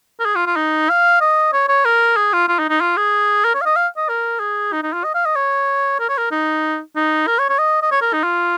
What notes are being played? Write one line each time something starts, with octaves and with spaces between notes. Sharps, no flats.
A#4
G#4
F4
F4
D#4
F5
D#5
C#5
C#5
A#4
G#4
F4
F4
D#4
D#4
F4
G#4
A#4
C#5
F5
D#5
F5
D#5
A#4
G#4
D#4
D#4
F4
D#5
F5
D#5
C#5
A#4
C#5
A#4
D#4
D#4
A#4
C#5
C#5
D#5
D#5
C#5
A#4
D#4
F4